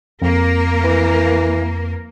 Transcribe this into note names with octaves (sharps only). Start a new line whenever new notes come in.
F2 A#3 A#4
E3